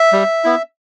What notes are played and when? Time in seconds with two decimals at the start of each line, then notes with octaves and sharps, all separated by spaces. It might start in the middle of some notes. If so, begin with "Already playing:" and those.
Already playing: E5
0.13 G3
0.44 B3 E4